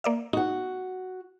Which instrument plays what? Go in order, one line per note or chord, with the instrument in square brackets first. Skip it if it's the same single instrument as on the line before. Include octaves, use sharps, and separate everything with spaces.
[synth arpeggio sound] A#3 D5 E5
[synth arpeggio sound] D#4 [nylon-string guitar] F#4 F#5